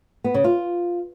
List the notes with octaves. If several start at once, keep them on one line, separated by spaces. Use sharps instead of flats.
B3
C#3
F4